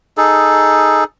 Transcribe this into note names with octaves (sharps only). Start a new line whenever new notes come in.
D#4 G#4 A4